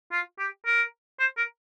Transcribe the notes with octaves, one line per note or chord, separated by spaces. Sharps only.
F4
G4
A#4
C5
A#4